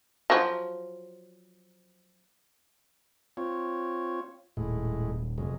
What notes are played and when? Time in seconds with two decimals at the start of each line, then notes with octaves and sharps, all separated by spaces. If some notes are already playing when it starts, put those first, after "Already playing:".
0.30 F3 F#3
3.37 C4 F4 C#5
4.57 D#1 A2 G#3
5.38 F1 F#2 G#3